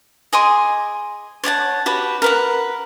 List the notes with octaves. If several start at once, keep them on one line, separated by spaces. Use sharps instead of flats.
G#4 D#5 C6 D6
C#5 D5 F#5 A5
F#4 G4 B4
A#4 B4 F#5